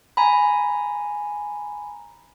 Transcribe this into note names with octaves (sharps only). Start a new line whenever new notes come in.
G#5 A#5 B5